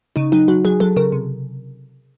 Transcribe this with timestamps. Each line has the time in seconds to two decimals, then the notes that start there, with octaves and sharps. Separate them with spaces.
0.16 C#3 D#4
0.32 F#3 D#4
0.48 F#3 F#4
0.65 F#3 G#4
0.80 F#3 A4
0.96 C#3 A#4
1.12 C3